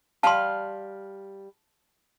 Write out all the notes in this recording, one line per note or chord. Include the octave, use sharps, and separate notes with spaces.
G3 F5 A5 C6